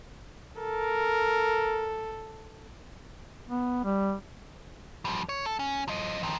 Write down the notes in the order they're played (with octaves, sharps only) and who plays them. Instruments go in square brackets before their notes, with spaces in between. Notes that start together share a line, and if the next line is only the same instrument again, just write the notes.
[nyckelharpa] A4 [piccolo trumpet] A#4
[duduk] B3
G3
[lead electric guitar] F3 G3
C#5
A4
C#4
F3 D#5
D#3 F3